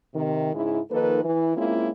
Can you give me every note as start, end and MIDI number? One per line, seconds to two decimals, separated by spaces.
0.14 0.51 48
0.14 0.51 51
0.54 0.79 44
0.54 0.79 49
0.54 0.79 56
0.54 0.79 64
0.91 1.22 51
0.91 1.22 53
0.91 1.22 58
0.91 1.22 63
0.91 1.22 69
0.91 1.22 71
1.24 1.53 52
1.56 1.89 56
1.56 1.89 58
1.56 1.89 60
1.56 1.89 61
1.56 1.89 64
1.56 1.89 65